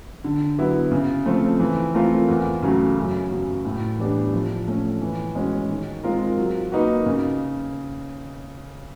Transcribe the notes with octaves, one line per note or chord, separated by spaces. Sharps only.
D3
F#3 B3 E4
C#3
F3 A3 C4
E3
A3 C4 F4 A#4
E2
C#3 F#3 A3
F#2
C#3 F#3
A2
E3 G3 B3 D4
F3
A3 C#4
E3
G#3 C#4 F#4
D#3
G#3 C4 F4 A#4
F#3
A#3 D#4 F#4 B4
C#3